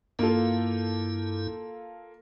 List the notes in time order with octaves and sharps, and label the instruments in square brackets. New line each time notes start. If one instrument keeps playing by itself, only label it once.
[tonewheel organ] G2 E4 [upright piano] A#3 F4 A4